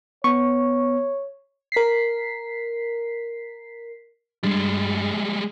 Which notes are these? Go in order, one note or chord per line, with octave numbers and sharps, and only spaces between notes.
B3 C#5 C#6
A#4 B6 C7
G2 G3 G#3 A6